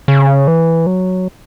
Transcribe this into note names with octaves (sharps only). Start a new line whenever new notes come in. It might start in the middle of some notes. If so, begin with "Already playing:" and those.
C#3
E3
F#3